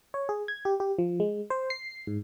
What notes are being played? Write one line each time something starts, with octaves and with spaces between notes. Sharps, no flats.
C#5
G#4
G#6
G4
G4
F3
G#3
C5
C7
G#2